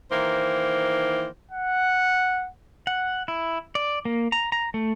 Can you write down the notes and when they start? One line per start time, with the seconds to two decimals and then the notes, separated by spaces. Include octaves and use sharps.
0.11 D#3 E3 A#3 C5
1.51 F#5
2.87 F#5
3.28 E4
3.75 D5
4.05 A#3
4.32 A#5
4.52 A#5
4.74 A3